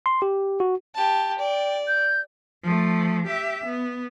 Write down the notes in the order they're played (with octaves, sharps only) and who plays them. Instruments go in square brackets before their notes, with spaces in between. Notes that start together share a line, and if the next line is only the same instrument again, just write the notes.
[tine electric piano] C6
G4
F#4
[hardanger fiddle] G4 A5
[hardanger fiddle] D5 [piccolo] G5
[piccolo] G6
[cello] F3 A3
G4 E5
B3